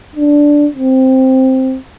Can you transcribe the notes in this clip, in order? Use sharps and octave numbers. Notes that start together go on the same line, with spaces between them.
D4
C4